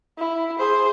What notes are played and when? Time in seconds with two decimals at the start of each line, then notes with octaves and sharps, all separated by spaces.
0.18 E4
0.59 G#4 C5